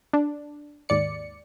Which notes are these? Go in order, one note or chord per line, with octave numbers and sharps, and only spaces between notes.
D4
D#2 G#2 D5 C#7